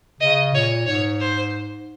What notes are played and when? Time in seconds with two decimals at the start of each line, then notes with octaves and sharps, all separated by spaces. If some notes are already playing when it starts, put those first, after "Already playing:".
0.21 C#3 D#5
0.54 A#2 C#5
0.87 G#2 C#5
1.20 C5